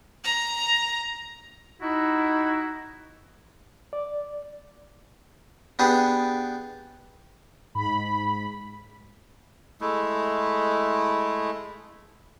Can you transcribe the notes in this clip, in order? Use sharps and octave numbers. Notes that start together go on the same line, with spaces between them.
A#5
D#4 E4 F#4
D5
B3 D4 G4 G#4 B4
G#2 B5
G#3 A3 E4